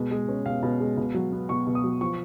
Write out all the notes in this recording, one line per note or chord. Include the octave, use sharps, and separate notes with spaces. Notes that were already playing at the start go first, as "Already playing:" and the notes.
Already playing: B2 G#3
G#3
C#4
B2 F5
B2
G#3
B2
F#3
B3
B2 C#6
B2
D#6
F#3
F3 C#6